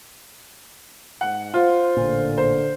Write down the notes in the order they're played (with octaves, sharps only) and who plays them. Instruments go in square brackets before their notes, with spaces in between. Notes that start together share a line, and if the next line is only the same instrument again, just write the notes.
[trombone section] G#2 [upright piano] F#5
[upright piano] F4 [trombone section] C5
[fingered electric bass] A1 A#2 [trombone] D3
[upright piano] C5